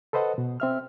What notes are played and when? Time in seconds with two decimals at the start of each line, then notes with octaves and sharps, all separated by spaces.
0.13 A4 B4 C5 D#5 F#5
0.38 B2
0.60 C4 E5 F6